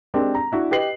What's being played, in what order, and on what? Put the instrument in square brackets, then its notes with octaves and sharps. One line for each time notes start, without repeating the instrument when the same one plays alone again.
[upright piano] G#3 C4 D4 G4 A#4
A#5
D4 E4 F#4
G4 B4 D#5 C7 F#7